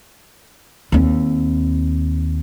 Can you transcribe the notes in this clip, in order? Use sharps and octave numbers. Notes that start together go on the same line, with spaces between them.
D#2 C4